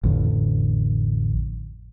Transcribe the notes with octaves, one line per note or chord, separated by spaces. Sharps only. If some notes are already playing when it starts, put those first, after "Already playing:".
A1 F2 D3